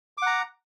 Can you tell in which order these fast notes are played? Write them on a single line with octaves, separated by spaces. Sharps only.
D6 F#5 A#5